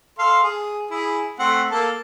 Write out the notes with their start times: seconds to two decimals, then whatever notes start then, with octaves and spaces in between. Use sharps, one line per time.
0.19 A4 F5 C6
0.43 G#4
0.91 E4 G#4
1.39 A3 C4 F#5
1.71 A#3 A4 A5